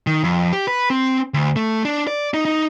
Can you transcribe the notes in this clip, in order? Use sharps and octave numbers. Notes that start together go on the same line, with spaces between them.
D#3
F2
G4
B4
C4
D2
A3
D4
D5
D#4
D#4